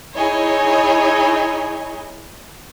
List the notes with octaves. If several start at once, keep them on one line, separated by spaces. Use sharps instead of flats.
D#4 E4 G#4 C#5 D#5